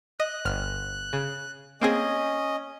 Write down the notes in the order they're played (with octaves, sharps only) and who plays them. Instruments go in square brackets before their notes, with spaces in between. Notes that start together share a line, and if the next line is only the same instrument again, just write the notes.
[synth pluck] D#5 [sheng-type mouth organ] F#6
[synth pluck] G1 F6
C#3
[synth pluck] A#3 C4 G#4 [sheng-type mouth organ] C#4 D#5